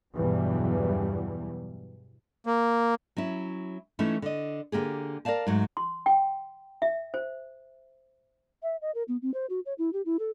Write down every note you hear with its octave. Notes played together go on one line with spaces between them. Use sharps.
E2 G2 B2 E3 F#3 G3
A#3
F#3 C#4 E4
E3 A3 C#4 D#4 E4
D3 D#5
D3 A#3 G4 G#4
A#4 C#5 D5 F5 A5
G#2 F#3 A3
C6
G5
E5
C5
E5
D#5
A#4
B3
C4
C5
F#4
C#5
E4
G4
E4
A4